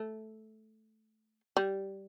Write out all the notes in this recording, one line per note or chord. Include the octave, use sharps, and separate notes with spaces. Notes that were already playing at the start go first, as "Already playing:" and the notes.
Already playing: A3
G3